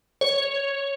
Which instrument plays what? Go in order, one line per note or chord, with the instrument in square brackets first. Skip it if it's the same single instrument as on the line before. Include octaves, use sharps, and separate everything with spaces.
[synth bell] C#5